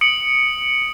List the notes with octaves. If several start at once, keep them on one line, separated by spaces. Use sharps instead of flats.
D#6 C#7 D7 F#7